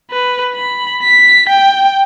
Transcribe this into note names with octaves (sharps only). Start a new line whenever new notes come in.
B4
B5
B6
G5